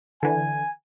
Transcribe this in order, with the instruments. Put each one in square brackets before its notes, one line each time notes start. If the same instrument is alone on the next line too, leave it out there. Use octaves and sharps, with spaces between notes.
[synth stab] D3 E3 [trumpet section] G#5